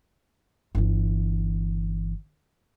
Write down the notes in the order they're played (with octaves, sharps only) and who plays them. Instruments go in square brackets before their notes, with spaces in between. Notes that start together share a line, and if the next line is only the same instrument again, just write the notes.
[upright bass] G1 E3